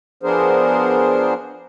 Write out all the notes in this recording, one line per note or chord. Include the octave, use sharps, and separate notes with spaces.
F3 B3 D4 G#4 A#4 C5